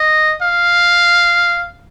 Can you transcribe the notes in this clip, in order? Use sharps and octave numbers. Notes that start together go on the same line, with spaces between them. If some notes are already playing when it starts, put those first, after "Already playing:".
Already playing: D#5
F5